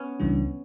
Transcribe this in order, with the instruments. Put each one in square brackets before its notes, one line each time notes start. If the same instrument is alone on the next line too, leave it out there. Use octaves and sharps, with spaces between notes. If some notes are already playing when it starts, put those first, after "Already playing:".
Already playing: [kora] B3 C#4
[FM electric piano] C#2 C#3 E3 G3 D4